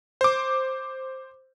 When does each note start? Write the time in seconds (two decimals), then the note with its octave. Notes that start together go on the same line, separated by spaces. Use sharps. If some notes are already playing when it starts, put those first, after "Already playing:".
0.21 C5 D6